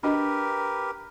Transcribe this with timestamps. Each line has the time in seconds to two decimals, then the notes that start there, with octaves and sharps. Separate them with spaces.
0.03 D4 F#4 G4 A#4 B4 D#5